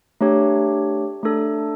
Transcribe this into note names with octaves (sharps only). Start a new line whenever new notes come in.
A3 D4 G4 C#5
A3 D4 A4